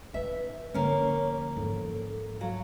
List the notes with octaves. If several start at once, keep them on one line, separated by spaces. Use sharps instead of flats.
D#4 B4 E5
D3 F3 A#3 C#4 C#5
G#2 F3 A4
F#3 F5